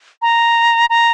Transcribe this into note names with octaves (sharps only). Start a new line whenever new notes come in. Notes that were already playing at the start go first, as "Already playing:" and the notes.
A#5
A#5